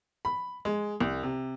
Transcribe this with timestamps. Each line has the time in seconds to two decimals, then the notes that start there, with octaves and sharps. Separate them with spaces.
0.25 B5
0.65 G#3
1.00 C2
1.23 C3